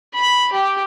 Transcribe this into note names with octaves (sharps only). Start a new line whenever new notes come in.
B5
G4